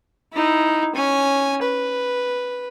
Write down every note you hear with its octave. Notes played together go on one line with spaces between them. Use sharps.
D#4 E4
C#4 G#5
B4